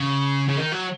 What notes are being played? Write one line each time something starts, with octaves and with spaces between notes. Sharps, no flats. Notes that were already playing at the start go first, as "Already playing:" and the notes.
Already playing: C#3
C#3
D#3
F#3